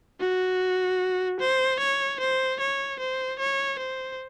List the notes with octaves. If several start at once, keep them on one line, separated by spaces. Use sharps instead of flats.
F#4
C5
C#5
C5
C#5
C5
C#5
C5